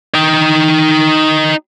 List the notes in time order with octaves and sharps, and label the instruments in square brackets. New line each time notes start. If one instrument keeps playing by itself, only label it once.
[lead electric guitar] D#4 G5